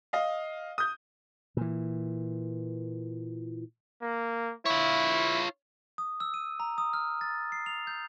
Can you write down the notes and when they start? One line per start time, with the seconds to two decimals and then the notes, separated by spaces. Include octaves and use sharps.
0.13 D#5 F5
0.78 D#6 G6
1.57 A#2 E3
4.02 A#3
4.66 E4 F4 C#5
5.98 D#6
6.20 E6
6.34 D#7
6.60 A#5
6.78 D#6
6.93 F6
7.21 A6
7.52 C7
7.66 F7
7.87 G6